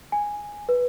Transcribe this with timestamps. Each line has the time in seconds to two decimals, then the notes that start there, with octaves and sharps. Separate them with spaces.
0.12 G#5
0.69 B4